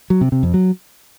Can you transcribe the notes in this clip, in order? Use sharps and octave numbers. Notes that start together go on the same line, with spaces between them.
F#3
C3
C3
F2
F#3